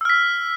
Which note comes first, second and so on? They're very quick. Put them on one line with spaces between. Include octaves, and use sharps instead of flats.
E6 F6 B6